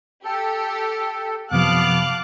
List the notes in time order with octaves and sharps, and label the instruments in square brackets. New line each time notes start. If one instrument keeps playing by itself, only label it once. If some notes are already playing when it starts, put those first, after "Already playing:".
[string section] G4 [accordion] A4
[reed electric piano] F#2 C3 F3 [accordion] B3 [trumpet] F5 [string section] A5 D6 F#6